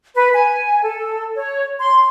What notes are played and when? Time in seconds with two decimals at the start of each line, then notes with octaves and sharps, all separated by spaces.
0.15 B4
0.33 G#5
0.82 A4
1.35 C#5
1.80 C6